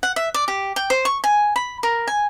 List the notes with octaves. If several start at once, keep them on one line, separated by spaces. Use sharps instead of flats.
F#5
E5
D5
G4
G5
C5
C#6
G#5
B5
A#4
G#5